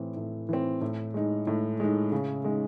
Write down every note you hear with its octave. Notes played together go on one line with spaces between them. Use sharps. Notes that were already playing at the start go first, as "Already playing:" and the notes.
Already playing: A2 E3 C4
A2
E3 C4
A2
G#3 D#4
A2
G#3 D#4
C#3
G#3 D#4